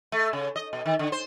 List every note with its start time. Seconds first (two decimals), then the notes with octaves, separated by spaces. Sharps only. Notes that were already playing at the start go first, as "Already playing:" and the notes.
0.12 A3
0.33 C#3
0.56 D#5
0.73 B2
0.86 D#3
0.99 D3
1.12 C5